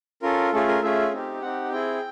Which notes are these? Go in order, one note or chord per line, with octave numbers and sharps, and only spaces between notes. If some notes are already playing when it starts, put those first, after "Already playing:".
C#4 F4 A4 A#4
A3 C#4 F4 G#4 A4
A#4
A3 C#4 F4 G#4 E5
C4 D#4 G4
C4 D#4 G4 F#5
C4 E4 G#4 G5